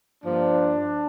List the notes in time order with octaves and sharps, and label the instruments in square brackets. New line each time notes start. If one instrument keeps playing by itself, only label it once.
[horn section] G2 F3 A#3 D4